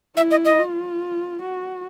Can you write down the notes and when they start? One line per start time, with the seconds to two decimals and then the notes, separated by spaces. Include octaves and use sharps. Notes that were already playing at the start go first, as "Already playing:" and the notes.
0.16 E4 E5
0.31 D#5
0.45 D#5
0.59 F4
1.42 F#4